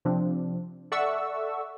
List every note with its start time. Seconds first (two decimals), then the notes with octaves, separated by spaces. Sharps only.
0.05 C3 F3 C4 D4
0.92 A4 D5 E5 F#5 C#6 E6